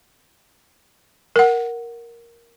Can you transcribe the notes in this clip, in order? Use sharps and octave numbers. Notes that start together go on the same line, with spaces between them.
A#4 F#5